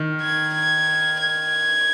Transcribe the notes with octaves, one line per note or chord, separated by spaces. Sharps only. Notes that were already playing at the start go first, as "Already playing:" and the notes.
Already playing: D#3
G#6
G#6
G#6